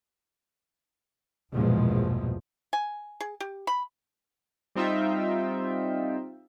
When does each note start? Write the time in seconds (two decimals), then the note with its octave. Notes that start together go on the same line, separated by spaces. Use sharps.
1.52 A#1 E2 G2 B2 F3 G#3
2.73 G#5
3.20 G#4
3.40 G4
3.67 B5
4.75 G3 C4 D#4 F4 E5 G5